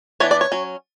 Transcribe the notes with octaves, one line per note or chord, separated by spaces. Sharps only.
E3 B3 D4 C#5
D5
C#5
F#3 C#4